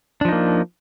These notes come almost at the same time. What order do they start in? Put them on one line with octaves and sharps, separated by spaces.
D4 F3 D#4 A#3